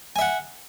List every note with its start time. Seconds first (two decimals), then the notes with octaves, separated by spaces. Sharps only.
0.16 G#5
0.19 E5
0.21 F#5